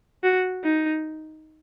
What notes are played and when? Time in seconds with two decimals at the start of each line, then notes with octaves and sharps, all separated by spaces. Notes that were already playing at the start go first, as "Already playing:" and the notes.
0.24 F#4
0.64 D#4